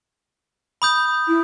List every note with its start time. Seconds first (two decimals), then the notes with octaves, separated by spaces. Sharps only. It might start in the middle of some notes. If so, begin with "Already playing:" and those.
0.82 B5 D#6 G6
1.28 E4